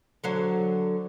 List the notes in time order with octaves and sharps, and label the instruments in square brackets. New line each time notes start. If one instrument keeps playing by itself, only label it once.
[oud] D3 F#3 C5